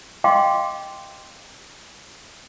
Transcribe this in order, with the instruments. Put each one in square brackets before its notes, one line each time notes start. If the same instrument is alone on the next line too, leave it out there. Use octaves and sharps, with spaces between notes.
[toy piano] D#5 F5 G5 C6 D6